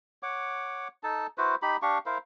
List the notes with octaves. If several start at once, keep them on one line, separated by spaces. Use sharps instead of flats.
C#5 F#5 D6
D#4 A4 A5
E4 F#4 B4 C5
D#4 G4 B5
D4 G4 F5 C#6
E4 A#4 C5 F5